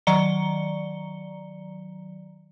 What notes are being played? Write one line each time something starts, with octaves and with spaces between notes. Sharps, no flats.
D#3 F#3 D5 A#5 C#7 G7